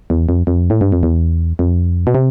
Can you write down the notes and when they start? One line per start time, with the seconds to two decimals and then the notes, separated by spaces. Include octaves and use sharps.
0.10 E2
0.29 F2
0.47 F2
0.70 A2
0.81 G2
0.92 F2
1.03 E2
1.59 F2
2.07 B2
2.15 C3